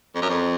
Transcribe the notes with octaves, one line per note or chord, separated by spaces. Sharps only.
F2
F#2
F2